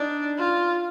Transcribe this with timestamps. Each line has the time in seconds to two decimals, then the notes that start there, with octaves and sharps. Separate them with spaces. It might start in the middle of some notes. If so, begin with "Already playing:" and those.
Already playing: D4 D#4
0.38 F4